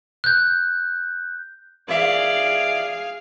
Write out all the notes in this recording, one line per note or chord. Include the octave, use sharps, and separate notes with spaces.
F#6 G6
A#2 E3 G#4 D5 E5 F5